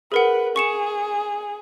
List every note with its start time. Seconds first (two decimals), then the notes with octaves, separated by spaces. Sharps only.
0.12 G#4 A#4 B4 F#5
0.56 G#4 C#6 C#7 E7